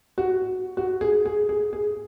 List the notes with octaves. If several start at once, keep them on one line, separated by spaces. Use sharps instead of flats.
F#4
F#4
G#4
G#4
G#4
G#4